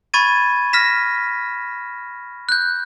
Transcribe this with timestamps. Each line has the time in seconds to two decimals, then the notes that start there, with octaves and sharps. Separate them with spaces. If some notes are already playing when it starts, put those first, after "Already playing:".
0.14 B5 C#6 G#6 A6 D#7
0.73 F6 A#6 B6 E7
2.49 F#6 G6